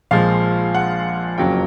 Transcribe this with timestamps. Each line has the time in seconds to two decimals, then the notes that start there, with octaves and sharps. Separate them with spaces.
0.11 A#1 A#2 F3 G#3 F5
0.74 F#5
1.38 F#1 F2 C#3 F#3 A#3 G5